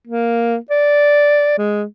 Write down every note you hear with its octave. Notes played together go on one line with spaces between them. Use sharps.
A#3
D5
G#3